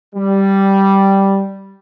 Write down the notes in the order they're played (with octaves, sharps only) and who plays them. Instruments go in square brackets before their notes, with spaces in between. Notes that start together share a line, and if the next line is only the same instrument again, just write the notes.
[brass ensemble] G3